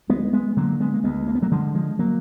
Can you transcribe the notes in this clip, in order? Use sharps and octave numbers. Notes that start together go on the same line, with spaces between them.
D2 G#3 B3
G#3 B3
D3 F#3 A#3
G#3 B3
A#3
D2 G#3 B3
A#3
B3
F#3 A#3
D3 F3 G#3
F3 G#3
F#3 A#3